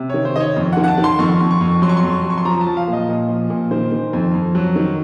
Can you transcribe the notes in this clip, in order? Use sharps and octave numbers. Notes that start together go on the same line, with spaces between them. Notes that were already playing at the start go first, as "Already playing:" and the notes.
Already playing: C3
D#3 C#5
C5
D#3 C#5 D#5
F2
F#5
D#3
F#5
A5
D#3
C6
F2 C#6
F2
C#6
F2
F#3 C6
C#6
C6
F2
F#3
C#6
C6
F3 A#5
A5
F3
F5
A#2
D#5
A#2
F3
A#2
D#3 C5
D#3
F2
F2
F#3
D#3